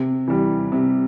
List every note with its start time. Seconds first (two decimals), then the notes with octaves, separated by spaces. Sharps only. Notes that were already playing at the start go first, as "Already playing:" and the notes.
Already playing: C3
0.28 E3 G3
0.72 C3